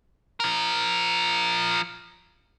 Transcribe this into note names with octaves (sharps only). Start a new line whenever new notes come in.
F3 A#4